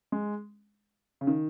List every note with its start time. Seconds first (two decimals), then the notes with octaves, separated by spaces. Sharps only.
0.12 G#3
1.21 C#3
1.27 D#3